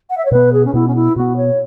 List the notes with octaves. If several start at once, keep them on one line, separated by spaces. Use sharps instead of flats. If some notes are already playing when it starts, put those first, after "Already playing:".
F#5
E5
C#5
B2 B3 B4
G#4
C#4
B2 B3 E4
C#4
E4
B2 B3 F#4
C#5